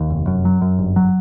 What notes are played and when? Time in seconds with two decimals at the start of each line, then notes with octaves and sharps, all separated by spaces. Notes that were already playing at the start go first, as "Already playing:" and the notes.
Already playing: D#2
0.10 F1
0.27 F#2
0.45 F#3
0.61 F#2
0.79 G1
0.96 F#3